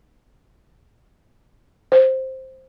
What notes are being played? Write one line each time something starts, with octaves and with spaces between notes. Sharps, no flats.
C5